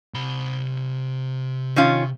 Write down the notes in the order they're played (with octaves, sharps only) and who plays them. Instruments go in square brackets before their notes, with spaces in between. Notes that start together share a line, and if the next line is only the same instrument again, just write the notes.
[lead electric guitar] C3 B5
[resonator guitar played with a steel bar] D#3 C#4 F4